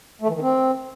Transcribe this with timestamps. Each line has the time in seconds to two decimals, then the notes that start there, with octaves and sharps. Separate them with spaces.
0.21 A3
0.28 E3
0.35 D#3
0.42 C4